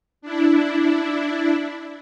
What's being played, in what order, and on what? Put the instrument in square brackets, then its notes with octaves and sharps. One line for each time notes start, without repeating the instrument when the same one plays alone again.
[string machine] D4 E4